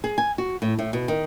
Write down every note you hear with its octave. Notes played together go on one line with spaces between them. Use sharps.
G#4
G#5
F#4
A2
A2
B2
D#3